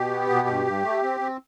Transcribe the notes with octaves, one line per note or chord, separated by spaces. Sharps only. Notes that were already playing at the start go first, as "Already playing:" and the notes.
Already playing: B2 G4
B3
B2
G2
G2
A3
C4
C4